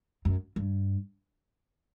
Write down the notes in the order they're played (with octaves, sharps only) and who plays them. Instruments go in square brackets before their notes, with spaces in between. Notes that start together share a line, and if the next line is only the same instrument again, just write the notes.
[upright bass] F#2
G2